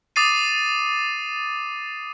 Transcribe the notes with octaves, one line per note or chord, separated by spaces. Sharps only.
D6 D#6 A6 C7 D#7